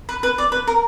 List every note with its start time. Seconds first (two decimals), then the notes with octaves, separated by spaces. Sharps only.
0.09 B4
0.23 B4
0.38 D5
0.52 B4
0.67 A#4